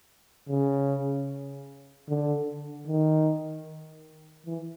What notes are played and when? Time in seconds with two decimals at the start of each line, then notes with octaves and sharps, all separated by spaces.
0.49 C#3
2.09 D3
2.87 D#3
4.46 E3